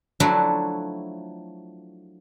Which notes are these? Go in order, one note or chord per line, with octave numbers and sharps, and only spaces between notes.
F3 F#3 A3 D4 E4 F#4